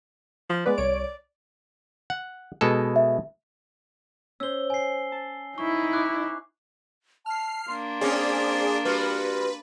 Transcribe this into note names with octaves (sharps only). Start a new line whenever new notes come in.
F3
G#3 B3 B4 D5
C2 C#5 D7
F#5
B2 G#3 A4
E5
C#4 C5 E6 G7
G#5 C7
A5
D#4 E4 C#6
D6 F#6
A5 F6 C7
A#3 D4 C6
C4 C#4 G#4 D5
G3 F4 F#4 B4